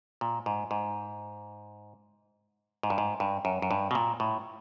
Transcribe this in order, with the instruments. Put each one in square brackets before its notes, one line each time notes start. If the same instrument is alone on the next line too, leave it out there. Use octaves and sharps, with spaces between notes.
[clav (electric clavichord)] A#2
G#2
G#2
G#2
G2
G#2
G2
F#2
F#2
G2
B2
A#2
A2